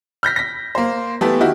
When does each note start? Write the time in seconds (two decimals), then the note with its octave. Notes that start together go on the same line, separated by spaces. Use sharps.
0.23 F6 G6 A#6 B6
0.36 A#6 B6
0.75 A#3 C5
1.21 E3 A3 B3 G4 A4
1.41 D#3 E4 F#4 G4